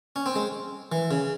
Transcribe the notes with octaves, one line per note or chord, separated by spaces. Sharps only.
C#4
C4
G#3
E3
C#3